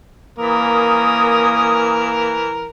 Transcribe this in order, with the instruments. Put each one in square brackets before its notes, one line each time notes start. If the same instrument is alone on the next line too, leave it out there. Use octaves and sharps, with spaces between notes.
[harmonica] E3 A#4 [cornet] A#3 [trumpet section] C#4 D#6